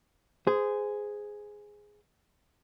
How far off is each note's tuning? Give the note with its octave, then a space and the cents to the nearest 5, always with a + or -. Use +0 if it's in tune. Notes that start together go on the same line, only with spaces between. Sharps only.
G#4 +0 C5 -25